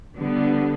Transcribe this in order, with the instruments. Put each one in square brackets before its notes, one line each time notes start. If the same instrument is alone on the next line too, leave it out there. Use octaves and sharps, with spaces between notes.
[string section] D3 G3 B3